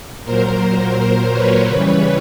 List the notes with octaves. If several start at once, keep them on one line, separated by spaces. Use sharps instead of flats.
A#2 F#3 A#4 C5
A#4 C5
B4 C#5
C#3 E3 G3